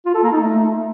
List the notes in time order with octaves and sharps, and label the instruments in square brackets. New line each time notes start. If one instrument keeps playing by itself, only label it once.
[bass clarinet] F4
A4
A#3
D#4
A3